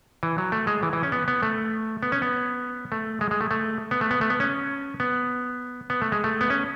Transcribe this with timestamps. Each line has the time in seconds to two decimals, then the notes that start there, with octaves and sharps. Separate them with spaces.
0.23 E3
0.38 F#3
0.52 A3
0.67 G#3
0.83 E3
0.93 E3
1.03 C#4
1.12 B3
1.28 B3
1.43 A3
2.03 B3
2.12 C#4
2.22 B3
2.92 A3
3.21 G#3
3.31 G#3
3.41 A3
3.51 A3
3.91 B3
4.01 A3
4.11 B3
4.21 A3
4.30 B3
4.40 C#4
5.00 B3
5.90 B3
6.02 A3
6.12 G#3
6.24 A3
6.41 B3
6.50 C#4